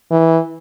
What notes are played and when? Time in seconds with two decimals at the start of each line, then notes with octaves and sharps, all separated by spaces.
0.12 E3